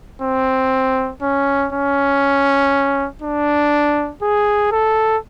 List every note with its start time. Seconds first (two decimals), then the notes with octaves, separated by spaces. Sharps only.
0.22 C4
1.22 C#4
1.73 C#4
3.22 D4
4.22 G#4
4.72 A4